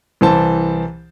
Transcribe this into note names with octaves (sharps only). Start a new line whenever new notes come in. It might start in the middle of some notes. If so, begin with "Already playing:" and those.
C2 E3 C5 A5